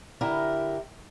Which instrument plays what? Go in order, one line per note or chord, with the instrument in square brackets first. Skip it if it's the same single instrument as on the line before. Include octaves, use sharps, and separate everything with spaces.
[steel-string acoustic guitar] D3 E4 G4 A#4